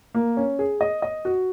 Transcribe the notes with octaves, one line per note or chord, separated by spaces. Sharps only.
A#3
C#4
G#4
D#5
D#5
F#4